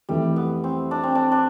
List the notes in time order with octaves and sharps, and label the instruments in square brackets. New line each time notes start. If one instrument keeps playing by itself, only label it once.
[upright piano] F2 E3 A3 [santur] G3
[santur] B3
C4
D4
C4
D4
D4